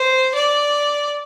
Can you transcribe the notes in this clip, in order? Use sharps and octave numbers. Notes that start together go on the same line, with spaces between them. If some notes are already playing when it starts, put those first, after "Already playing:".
Already playing: C5
D5